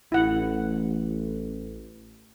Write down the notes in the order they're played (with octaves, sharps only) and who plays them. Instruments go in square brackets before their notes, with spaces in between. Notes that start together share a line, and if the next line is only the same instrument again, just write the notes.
[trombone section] A1 [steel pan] E4 F#5